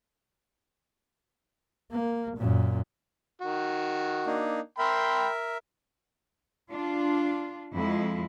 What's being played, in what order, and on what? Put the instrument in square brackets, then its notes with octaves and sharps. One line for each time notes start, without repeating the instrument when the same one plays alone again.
[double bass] A#3
F#2 A#2
[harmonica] D#3 F#4
[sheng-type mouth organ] A#3 D4 D#4
[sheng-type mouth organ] A#4 E5 [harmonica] G5 B5 C6
[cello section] D4 F4
F2 G#3 E4 F4